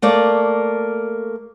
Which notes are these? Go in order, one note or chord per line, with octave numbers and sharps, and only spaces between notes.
A3 A#3 D5